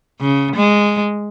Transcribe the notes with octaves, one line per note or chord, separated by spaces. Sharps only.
C#3
G#3